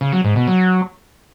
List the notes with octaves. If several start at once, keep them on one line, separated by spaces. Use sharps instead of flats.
C#3
F#3
G#2
B2
F#3